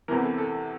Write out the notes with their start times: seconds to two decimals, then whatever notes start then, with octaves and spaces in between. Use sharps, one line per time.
0.08 E2 C3 E3 A#4
0.23 A4
0.38 A4